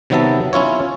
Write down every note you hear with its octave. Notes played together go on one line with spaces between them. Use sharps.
C3 D#3 F#3 B3 E5 A5
C#4 E4 F4 C#5